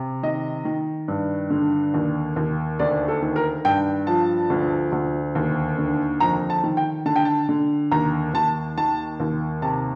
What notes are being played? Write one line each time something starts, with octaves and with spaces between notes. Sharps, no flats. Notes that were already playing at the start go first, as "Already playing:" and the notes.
Already playing: C3
D#3 D#5
D#3
G2
D3
D#2
D#2
D2 D5
A4
D#3
A#4
G2 G5
F3 A5
D2
D2
D#2
D3
F2 A#5
A5
D#3
G5
D3 A5
G5
A5
D3
D#2 A#5
D#2 A5
D#3 A5
D#2
C3 A5